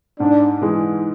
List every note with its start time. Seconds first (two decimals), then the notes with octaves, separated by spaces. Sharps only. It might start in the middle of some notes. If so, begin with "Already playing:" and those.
0.20 G#2 D4
0.62 E3 G#3